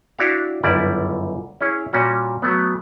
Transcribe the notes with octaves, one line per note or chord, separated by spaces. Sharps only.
D4 E4 F#4 G4 F5
G1 C#2 F#2 G3 E4 D5
C#4 E4 G#4 C#5
A#2 G3 C#4 F#4
F#3 A3 B3